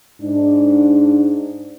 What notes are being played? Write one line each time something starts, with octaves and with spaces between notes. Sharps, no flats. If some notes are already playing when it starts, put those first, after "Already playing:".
G#2 D4